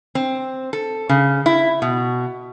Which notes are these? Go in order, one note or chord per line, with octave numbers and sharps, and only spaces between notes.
C4
A4
C#3
E4
B2